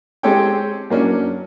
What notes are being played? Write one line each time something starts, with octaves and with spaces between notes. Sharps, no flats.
G#3 C4 G4 A4 C#5 G5
F#3 A#3 C#4 D4